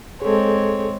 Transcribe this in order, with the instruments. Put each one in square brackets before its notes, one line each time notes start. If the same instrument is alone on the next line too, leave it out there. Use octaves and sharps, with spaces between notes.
[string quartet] G#3 C4 C#5 [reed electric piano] G#4 A4